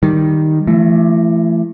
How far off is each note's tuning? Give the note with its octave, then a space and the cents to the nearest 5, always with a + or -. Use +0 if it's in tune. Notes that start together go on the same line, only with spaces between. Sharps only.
D#3 +0 G3 +0
E3 +40 A3 +0